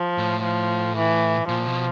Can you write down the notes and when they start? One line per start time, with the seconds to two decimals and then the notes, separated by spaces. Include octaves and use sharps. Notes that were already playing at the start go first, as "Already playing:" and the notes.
Already playing: F3
0.18 A2
0.43 F3
0.97 E3
1.48 A#2 F3
1.66 B2